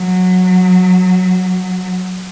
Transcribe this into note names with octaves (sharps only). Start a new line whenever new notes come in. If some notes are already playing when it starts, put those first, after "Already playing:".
Already playing: F#3